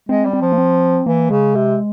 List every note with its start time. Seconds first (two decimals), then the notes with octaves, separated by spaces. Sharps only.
0.09 G#3 C4
0.25 G3
0.33 C4
0.41 F3
0.52 A#3
0.58 C4
1.06 E3 A#3
1.30 C#3 G#3
1.55 C3